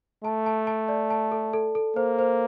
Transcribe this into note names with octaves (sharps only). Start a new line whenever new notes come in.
A3 A5
A5
A5
D5
A5
A4
A4
A4
A#3 C5
C5